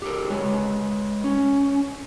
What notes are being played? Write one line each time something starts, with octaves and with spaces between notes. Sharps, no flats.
G4 A4 A#4
G#3 B4 C#5
C#4